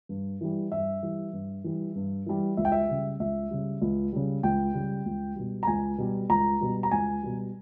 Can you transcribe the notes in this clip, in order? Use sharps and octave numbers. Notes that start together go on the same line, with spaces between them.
G2
E3 G3
G2 E5
E3 G3
G2
E3 G3
G2
E3 G3
C#2 E5
G5
E5
C#3 G3
C#2 E5
C#3 G3
C#2
C#3 G3
C#2 G5
C#3 G3
C#2
B2 G3
A#5
C#2 G#5
B2 G3
C#2 A#5
B2 G3
A#5
C#2 G#5
B2 G3